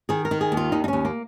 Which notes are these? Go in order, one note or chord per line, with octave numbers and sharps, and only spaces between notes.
D#3 G#4
A#4
D#3
G#4
D#2
F4
D#2 D#4
D#4
D#2 C#4
A#3